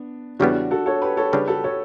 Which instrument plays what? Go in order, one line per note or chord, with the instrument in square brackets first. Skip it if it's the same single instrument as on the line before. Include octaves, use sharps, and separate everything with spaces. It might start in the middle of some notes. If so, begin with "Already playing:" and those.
Already playing: [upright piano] B3 D4
[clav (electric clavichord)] E2 C#3 G3 B3 [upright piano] D4 F#4
[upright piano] F#4 A4
A4 C#5
G4 B4
A4 C#5
[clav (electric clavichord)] C#3 G3 D4 [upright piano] G4 B4
[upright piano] F#4 A4
A4 C#5